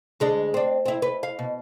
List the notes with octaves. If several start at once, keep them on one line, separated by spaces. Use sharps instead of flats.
D2 G#3 D4
C4 D4
C4 E4
B4
F5
B2